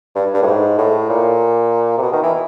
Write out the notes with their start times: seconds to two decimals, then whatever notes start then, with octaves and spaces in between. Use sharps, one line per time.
0.15 G2
0.34 G2
0.42 A2
0.46 G#2
0.78 A2
1.09 A#2
1.97 C3
2.02 B2
2.13 D#3
2.23 E3